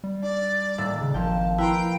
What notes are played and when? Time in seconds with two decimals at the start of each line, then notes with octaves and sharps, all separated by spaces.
0.04 G3
0.22 D4 D5
0.78 D#1 A2 E6
1.01 C#3
1.14 G#1 A#2 F3 G5 A5
1.58 E4 B4 G5 A#5 C6